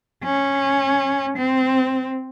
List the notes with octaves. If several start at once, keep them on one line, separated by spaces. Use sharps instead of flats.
C#4
C4